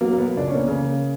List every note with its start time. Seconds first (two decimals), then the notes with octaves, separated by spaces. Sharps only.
0.01 F#3 A#3
0.13 A#3
0.18 B2 B3
0.37 C#2 D4
0.48 C#4
0.55 A#3 B3
0.68 C#3